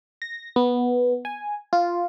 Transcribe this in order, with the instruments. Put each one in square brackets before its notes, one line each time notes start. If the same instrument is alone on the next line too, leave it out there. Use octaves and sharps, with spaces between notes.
[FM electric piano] A#6
B3
G#5
F4